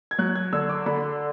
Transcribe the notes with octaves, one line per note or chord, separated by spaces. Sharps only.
G#6
F#3 F#6
G#6
D3 E6
D6
D3 B5